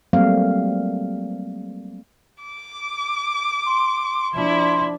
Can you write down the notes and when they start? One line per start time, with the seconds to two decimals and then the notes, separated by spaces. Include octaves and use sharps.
0.13 F#3 G3 A3 A#3 C4 F5
2.43 D6
3.66 C6
4.34 F3 D4 E4